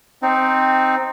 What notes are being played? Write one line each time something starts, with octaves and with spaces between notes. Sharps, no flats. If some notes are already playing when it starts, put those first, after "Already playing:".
C4 D#4